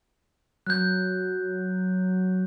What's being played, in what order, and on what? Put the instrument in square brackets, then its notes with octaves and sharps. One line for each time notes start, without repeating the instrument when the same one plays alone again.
[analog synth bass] F#3 [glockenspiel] F#6 G6